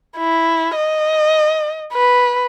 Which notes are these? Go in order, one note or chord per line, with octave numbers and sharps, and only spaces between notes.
E4
D#5
B4